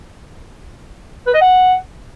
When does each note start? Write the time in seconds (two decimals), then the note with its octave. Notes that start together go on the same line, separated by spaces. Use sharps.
1.27 B4
1.34 D#5
1.41 F#5